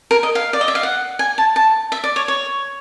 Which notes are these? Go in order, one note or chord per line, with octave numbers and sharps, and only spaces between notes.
A#4
D#5
F5
D5
D#5
E5
F5
F#5
G#5
A5
A5
E5
D5
C#5
C#5